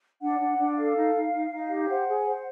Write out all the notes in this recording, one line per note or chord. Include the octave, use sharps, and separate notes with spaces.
D4 F#5
D4
D4
A4 F5
D#4
D#4
D#4
D#4
G4
C5 F#5
G#4
C5